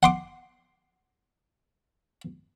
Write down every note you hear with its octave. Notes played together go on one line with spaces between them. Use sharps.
F#5 C6 D6